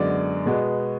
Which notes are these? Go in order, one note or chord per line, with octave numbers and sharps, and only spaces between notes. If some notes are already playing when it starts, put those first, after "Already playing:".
Already playing: F#2 D3 G#3 B3 D5
B2 G#3 B3